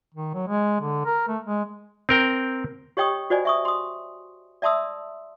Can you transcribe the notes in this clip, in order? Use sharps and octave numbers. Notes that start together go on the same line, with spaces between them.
D#3
F#3
G#3
D3
A#4
A3
G#3
C4 A#4 G5
G4 C#5 D#5 G5 C#6 D#6
F#4 C5 D5 D#5 G#5
E5 C#6 D#6
C6 D#6
D5 E5 A5 C6 D#6 E6